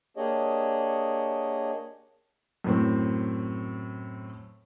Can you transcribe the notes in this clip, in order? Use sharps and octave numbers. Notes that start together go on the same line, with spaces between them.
A#3 D4 G4 G#4 C#5 D#5
F#2 A2 C4